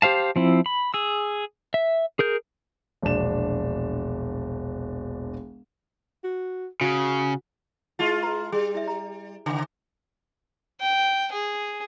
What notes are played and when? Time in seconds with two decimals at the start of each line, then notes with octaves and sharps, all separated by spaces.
0.02 G4 C5 F5 A5
0.36 F3 C4 E4
0.66 B5
0.94 G#4 E6
1.74 E5
2.19 G#4 A#4 G6
3.02 E1 A#1 B2 D4 E7
6.24 F#4
6.81 C#3 F#4
7.99 G#3 E4 F4 A5
8.23 B4 A#5 B5
8.52 G3 G#4
8.75 E4 E5
8.88 A#5
9.46 C#3 G#5
10.82 G5
11.33 G#4